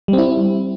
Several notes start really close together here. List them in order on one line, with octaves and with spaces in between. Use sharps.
G3 C4 E4